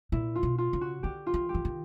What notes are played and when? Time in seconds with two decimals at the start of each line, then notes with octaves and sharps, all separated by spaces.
0.12 A#2 E4
0.35 F4
0.43 B2
0.58 F4
0.73 C#3
0.81 F#4
1.03 D3 G4
1.27 F4
1.34 E3
1.49 G4
1.54 E3
1.65 D#3